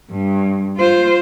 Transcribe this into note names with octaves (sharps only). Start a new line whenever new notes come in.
G2
F4 C5